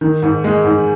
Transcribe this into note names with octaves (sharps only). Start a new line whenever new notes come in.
D#3
G#2
G#3
G#2